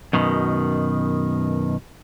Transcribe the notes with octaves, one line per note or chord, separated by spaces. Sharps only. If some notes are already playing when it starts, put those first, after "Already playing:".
F#2 B2 D#3